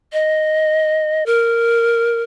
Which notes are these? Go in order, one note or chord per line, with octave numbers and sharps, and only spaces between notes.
D#5
A#4